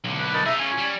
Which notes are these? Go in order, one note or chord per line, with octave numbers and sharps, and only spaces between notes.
B1 D3
B4
D#4 A#4 B4 A5
D#4 F4 G#4 D#5 E5
C#4 G#5
G3